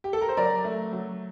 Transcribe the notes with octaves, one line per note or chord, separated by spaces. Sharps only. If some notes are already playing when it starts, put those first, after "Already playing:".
G4
A4
A#4
C5
F#3 A#4 D5
A3
F#3